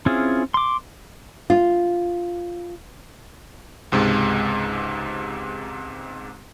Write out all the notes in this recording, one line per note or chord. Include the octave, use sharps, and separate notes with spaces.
C4 C#4 E4 F4 G#4
C6 D6
F4
C#2 G#2 C3 G#3